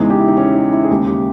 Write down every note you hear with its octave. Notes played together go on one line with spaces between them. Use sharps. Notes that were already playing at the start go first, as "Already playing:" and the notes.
Already playing: E2 C#3 E3 G#3 D#4
G4
E4
D#4
C#4
D#4
E4
G#4
D#2 C#3 G#3 G4
G4